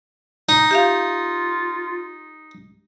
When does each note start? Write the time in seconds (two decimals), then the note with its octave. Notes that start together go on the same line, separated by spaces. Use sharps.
0.49 D#4 D#6
0.71 F4 G4 E5 F5